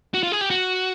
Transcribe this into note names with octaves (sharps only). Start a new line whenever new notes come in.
F#4
F4
G#4
G4
F#4